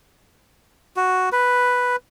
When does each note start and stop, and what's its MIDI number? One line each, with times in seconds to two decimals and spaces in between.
0.97 1.29 66
1.32 1.96 71